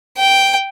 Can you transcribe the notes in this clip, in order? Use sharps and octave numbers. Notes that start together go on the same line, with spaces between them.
G5